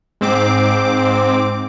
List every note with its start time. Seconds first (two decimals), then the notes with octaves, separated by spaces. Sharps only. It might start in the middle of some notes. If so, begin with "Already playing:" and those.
0.21 G#2 C4 D6